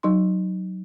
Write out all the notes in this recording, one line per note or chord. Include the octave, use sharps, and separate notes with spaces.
F#3 D#4 C6